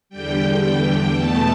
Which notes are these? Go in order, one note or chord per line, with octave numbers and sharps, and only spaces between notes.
E2 D3 G3 G5
G5
E2 B2 A3 A5